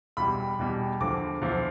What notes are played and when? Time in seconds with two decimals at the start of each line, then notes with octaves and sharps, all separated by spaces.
0.17 E2 B2 G3 B5
0.59 E2 B2 G3
1.00 E2 D3 F3 D6
1.41 E2 D3 F3